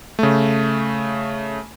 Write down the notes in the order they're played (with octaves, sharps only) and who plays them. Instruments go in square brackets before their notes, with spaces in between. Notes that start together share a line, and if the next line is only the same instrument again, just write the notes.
[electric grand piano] C#3 A3